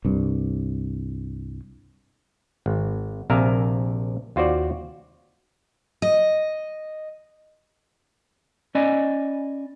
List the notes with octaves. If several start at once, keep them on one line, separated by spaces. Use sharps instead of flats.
C2 G2
G#1
A#1 C3 A#4 E5 F5 G#5
D#2 F4 F#4 C5 D5
D#5
C#4 D5 D#5 G#5 B5